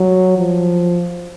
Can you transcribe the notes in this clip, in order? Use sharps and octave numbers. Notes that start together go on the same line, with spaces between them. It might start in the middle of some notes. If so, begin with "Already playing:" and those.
Already playing: F#3
F3